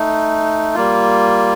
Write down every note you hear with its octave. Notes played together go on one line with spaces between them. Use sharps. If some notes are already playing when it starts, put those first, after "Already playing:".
Already playing: A3 D#4
G3 A#3 F4